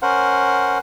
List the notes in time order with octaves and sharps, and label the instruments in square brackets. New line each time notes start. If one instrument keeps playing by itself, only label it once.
[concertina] C#4 A#4 C5 F#5